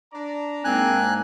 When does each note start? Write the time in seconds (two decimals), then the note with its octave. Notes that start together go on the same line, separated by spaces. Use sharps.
0.13 D4 D5 A#5
0.65 G#2 A#3 C4 G#5 F#6